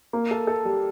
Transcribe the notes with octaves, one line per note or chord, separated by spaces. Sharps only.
A#3
A4
A4
G3